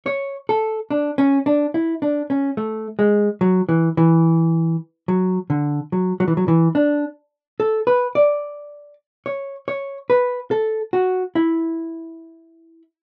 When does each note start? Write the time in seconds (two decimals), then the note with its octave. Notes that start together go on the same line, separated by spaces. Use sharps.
0.06 C#5
0.49 A4
0.90 D4
1.18 C#4
1.46 D4
1.74 E4
2.02 D4
2.30 C#4
2.57 A3
2.99 G#3
3.41 F#3
3.69 E3
3.97 E3
5.08 F#3
5.50 D3
5.92 F#3
6.20 F#3
6.28 E3
6.37 F#3
6.48 E3
6.75 D4
7.60 A4
7.87 B4
8.15 D5
9.26 C#5
9.68 C#5
10.10 B4
10.51 A4
10.93 F#4
11.35 E4